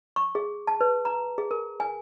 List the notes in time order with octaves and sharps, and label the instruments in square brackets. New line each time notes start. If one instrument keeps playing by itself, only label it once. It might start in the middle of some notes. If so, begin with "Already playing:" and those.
[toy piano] C#6
G#4
A5
B4
A#5
G#4
A#4
G#5